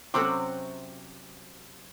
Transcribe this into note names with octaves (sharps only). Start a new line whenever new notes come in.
C3 F#3 C4 C#4 F#4 A4 C5 D6